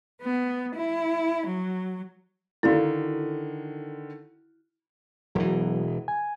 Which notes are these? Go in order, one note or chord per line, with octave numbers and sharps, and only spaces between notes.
B3
E4
F#3
D3 D#3 E4 F#4 A4 D5 F5
E1 B2 E3 F#3
G#5